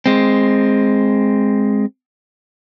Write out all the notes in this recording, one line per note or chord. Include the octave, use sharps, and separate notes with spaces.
G#3 C4